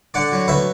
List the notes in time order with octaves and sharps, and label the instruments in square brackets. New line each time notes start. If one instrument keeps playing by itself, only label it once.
[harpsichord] D3 D5 F#5
F#3
D2 B4 E5